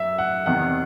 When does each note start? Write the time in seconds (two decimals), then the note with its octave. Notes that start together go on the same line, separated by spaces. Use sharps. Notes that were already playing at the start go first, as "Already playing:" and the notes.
Already playing: F#2 E5
0.18 F#5
0.46 E2 C3 D#3 F#5